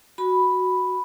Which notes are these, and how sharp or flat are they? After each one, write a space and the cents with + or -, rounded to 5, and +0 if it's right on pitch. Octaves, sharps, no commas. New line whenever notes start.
F#4 +0 B5 +0